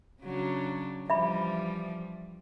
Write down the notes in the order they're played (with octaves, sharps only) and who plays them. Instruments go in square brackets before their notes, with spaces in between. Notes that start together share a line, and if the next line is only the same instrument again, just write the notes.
[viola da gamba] C#3 F#3 D4
[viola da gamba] E3 F3 G3 [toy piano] E5 B5